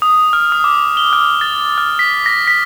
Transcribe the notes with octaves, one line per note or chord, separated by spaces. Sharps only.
D#6
F6
D#6
D6
G7
F6
A6
F6
B6
A#6
B6